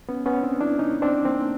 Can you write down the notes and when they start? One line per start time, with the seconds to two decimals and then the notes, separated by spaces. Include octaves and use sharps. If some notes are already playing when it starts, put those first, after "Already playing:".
0.09 B3 C#4
0.26 B3 C#4
0.43 C4 D4
0.61 D4 E4
0.79 C#4 D#4
1.02 C4 D4
1.25 A#3 C4